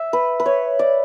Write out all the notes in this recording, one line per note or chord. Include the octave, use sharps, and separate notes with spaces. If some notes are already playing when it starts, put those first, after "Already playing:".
Already playing: E5
B4
B4
C#5
D5